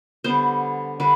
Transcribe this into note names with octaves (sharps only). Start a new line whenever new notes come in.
D3 G3 B3 C5
D3 G3 B4